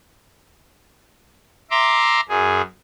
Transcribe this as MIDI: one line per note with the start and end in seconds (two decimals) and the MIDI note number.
1.71 2.21 76
1.71 2.21 82
1.71 2.21 84
1.71 2.21 86
2.29 2.62 42
2.29 2.62 68